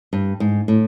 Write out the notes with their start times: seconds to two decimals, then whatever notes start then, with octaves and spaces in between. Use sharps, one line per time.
0.13 G2
0.40 G#2
0.68 A2